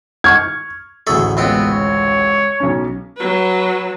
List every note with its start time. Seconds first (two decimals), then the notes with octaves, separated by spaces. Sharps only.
0.24 C#6 F6 G#6
1.07 A1 D2 G#4 A4 E5 C#6
1.37 C#2 B3 C4 G5
1.71 C#5
2.60 B1 C#4
3.17 F#3 B4